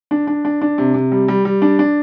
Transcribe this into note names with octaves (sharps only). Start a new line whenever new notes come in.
D4
D4
D4
D4
C3
C3
G3
G3
G3
D4
D4